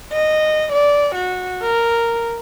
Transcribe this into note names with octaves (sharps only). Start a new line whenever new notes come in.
D#5
D5
F#4
A#4